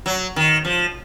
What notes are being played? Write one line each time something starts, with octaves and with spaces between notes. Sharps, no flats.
F#3
D#3
F3